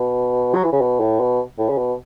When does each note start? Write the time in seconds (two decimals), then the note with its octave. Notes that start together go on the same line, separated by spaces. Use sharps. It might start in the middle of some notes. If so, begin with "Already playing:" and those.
Already playing: B2
0.55 F#3
0.64 E3
0.72 C#3
0.81 B2
1.00 A2
1.20 B2
1.59 A2
1.69 C#3
1.77 B2